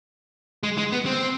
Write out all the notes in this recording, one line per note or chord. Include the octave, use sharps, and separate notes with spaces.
G#3
G#3
B3
C4